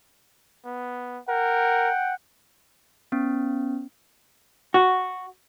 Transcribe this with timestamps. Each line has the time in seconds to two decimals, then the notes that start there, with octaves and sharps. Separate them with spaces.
0.65 B3
1.29 A#4 F#5 G5
3.12 B3 C#4
4.74 F#4